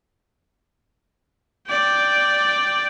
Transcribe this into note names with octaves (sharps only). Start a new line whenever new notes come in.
D5 G5